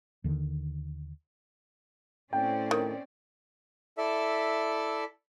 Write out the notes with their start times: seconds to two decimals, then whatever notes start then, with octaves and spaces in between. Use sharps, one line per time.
0.24 D#2 D3 D#3
2.33 A2 C4 C#4 D5 G5
2.71 D#3
3.98 E4 A4 D5 E5